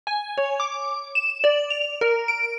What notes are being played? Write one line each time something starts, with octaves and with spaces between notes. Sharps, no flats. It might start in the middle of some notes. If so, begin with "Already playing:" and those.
G#5
C#5
D6
E7
D5
F7
A#4
D7